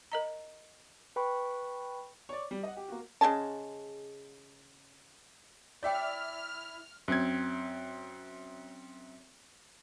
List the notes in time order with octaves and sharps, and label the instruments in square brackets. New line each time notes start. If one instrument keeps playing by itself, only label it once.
[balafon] A#4 D#5 A#5
[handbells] B4 G5 B5 C#6
[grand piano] C#5 D5
G3
D#5 F#5
G4
A#3 F#4
[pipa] C#3 G#3 G#4 A5
[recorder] E4 [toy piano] C#5 G5 [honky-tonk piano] D5 E5 D6 [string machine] F6
[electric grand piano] F#2 C4 G#6